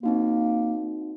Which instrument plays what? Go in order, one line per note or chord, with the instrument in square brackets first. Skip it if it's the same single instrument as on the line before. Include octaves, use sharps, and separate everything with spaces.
[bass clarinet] A#3 [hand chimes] C4 D#4 F#4